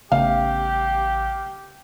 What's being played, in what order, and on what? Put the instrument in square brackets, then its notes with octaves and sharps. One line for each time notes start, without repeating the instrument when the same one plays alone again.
[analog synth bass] A1 [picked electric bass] C#3 A3 B3 [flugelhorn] G4 [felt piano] F5